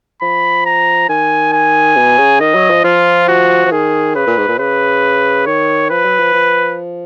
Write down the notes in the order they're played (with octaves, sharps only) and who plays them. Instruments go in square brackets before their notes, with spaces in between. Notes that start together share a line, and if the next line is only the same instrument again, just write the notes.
[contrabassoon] F3 [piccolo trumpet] B5
[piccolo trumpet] A#5
[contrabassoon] D#3 [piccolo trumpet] G#5
[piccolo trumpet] G#5
[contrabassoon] B2
C#3
[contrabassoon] D#3 [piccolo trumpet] D#5
[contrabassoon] F#3
F3
[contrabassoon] F3 [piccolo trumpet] F4
[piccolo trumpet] F#4
[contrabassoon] F3
[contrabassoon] D#3 [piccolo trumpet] G#4
[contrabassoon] C#3 [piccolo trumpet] B4
[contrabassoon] A#2
G#2
A#2
[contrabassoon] C#3 [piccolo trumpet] B4
[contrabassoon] D#3 [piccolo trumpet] C#5
[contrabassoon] F3 [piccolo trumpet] B4
[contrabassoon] F#3
F3
F3